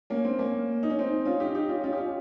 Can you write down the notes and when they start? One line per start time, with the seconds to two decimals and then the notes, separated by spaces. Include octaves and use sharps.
0.10 A#3 C#4
0.25 C4
0.39 A#3 C#4
0.83 D#4
0.90 C#4
0.99 C4 D#4
1.25 C#4 F4
1.40 D#4 G4
1.55 D#4 G4
1.69 C#4 F4
1.84 C#4 F4
1.93 G4
1.98 C#4 F4